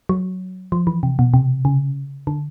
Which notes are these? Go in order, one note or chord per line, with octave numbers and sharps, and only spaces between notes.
F#3
F3
E3
C3
B2
C3
C#3
D3